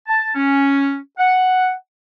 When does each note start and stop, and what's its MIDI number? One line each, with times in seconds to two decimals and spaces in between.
0.07 0.30 81
0.35 0.97 61
1.18 1.73 78